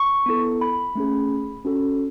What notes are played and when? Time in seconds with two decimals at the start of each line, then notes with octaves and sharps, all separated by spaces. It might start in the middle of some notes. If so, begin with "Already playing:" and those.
Already playing: C#6
0.26 B3 E4 A4
0.61 B5
0.95 A3 C#4 G#4
1.65 C#4 F#4 A4